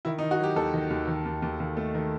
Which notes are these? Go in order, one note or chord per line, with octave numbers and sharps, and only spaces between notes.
D#3 E4
D#4
D#3
F#4
F#3 G4
D#2 A4
D#3
D#2
D#3
D#2
D#2
D#2
A3
D#3